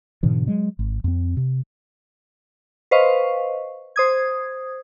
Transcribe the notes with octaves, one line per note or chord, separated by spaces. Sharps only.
G#2 B2 D3 E3
F#3 G#3
G#1
F2 C4
C3
B4 C5 D#5 F5 C#6
C5 D#6 G#6